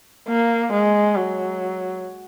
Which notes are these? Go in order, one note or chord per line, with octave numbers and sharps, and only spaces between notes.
A#3
G#3
F#3